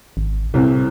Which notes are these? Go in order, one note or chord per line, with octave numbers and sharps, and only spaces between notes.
G#1
C2 A2 C3 C4